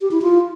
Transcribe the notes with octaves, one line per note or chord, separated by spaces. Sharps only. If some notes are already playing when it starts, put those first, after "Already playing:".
G4
E4
F4